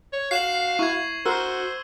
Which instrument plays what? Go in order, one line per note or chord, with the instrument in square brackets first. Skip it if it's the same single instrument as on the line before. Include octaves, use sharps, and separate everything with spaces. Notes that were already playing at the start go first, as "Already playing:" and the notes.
[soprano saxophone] C#5
[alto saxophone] F#4 [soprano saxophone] F5 [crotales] C7 E7 F#7
[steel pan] E4 [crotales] C#6 G#6
[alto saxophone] F#4 [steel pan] A#4 [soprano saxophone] C5 [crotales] E6 F6